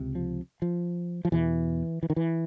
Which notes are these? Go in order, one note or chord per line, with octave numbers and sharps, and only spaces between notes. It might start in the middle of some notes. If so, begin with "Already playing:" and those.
Already playing: C#2 C3
F3
F3
F3
E2 B2 E3
E3
D#3
E3